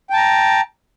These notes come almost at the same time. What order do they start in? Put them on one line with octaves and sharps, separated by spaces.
G5 A5 A#5